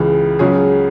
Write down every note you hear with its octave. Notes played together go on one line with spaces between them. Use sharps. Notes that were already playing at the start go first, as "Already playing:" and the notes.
Already playing: C#2 C#3 E3
C#2 C#3 F#3 C#4 G#4